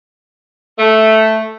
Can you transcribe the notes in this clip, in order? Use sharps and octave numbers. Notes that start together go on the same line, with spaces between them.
A3